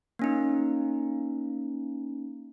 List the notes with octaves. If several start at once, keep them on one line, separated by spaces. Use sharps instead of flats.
A#3 C#4 D#4